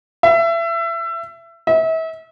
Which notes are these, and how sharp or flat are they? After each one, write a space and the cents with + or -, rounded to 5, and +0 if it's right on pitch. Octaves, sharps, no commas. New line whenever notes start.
E5 +25
E5 -35